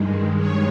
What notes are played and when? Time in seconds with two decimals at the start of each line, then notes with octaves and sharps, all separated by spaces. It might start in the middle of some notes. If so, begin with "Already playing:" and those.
Already playing: G2 D#3 G#3
0.39 C#5